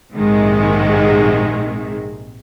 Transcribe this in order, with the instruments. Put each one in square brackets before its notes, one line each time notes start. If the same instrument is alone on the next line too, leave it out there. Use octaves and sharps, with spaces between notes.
[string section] A#1 G#2 C3 D#3 G#3